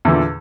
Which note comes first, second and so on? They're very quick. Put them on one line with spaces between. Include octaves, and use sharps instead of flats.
E2 D3 A#2